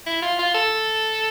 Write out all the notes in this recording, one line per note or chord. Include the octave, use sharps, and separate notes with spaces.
E4
F4
F4
A4